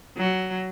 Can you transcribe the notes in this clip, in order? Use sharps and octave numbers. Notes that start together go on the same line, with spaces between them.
F#3